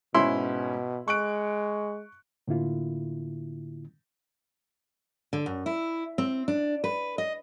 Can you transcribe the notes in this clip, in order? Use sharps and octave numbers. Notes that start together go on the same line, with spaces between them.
G#2 B2 C#4 E4 C6
G#3 C#6 F#6 D7
A2 D3 A#3 E4 F4
D3
F#2
E4
C4
D4
B4
D#5